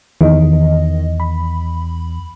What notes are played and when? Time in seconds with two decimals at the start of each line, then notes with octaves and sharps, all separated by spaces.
0.21 E2 D#3 D#5
1.20 B5